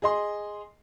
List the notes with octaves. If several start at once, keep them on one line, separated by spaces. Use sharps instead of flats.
G#4 D#5 C6